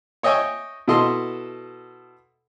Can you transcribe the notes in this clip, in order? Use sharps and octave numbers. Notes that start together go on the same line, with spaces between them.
C#5 D#5 E5 G5 G#5 C#6
B2 E4 A4 D#5 C6